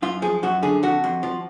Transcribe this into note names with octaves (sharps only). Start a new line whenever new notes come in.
F#2 F4
F3 G#4
F#2 F#4
D3 G#4
F2 F#4
F2
F3